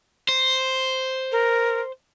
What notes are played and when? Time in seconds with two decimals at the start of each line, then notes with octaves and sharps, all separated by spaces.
0.29 C5
1.32 A#4